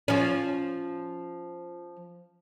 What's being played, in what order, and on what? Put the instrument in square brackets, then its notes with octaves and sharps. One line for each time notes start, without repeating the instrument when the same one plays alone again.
[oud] F3 C#4